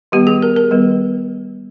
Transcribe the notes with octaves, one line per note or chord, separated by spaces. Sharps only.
D#3 G3 B3 G4
G#4
A#4
A#4
D#3 G3 B3